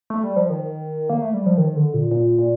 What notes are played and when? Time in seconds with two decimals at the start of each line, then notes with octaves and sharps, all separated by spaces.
0.10 A3
0.23 G3
0.36 F3
0.50 D#3
1.10 A#3
1.22 A3
1.34 G3
1.46 F3
1.58 D#3
1.76 D3
1.94 A#2
2.11 A#2
2.39 A#2